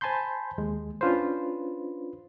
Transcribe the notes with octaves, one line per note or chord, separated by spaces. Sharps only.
C5 G#5 A5 B5 C6 G6
D#2 G#3
C#4 D4 F4 B4 C5